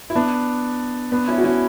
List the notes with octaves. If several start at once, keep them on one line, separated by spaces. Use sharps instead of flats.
E4
B3 D4
B3 D4
C#4 E4
F#4
C#4 E4